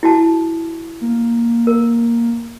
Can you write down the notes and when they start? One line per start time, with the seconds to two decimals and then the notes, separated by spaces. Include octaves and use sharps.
0.03 E4 F#4 A5
1.01 A#3
1.67 A#4